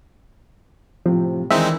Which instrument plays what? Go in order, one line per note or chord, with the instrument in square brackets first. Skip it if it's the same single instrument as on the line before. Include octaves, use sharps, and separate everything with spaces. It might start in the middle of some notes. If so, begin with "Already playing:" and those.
[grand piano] A2 C3 [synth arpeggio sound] F3
[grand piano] D#3 E3 D4 [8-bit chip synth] G#3 C4 D#4 [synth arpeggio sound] E5